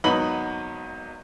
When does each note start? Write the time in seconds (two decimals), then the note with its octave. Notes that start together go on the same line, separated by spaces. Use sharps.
0.04 G#1 F#3 B3 D#4 B5 F#7